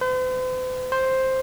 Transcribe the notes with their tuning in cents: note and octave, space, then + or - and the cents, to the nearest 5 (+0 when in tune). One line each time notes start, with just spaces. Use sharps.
C5 -45
C5 +5